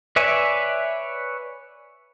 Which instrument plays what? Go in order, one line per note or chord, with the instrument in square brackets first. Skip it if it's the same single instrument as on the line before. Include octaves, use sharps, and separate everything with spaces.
[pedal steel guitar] B4 C#5 D5 E5 G#5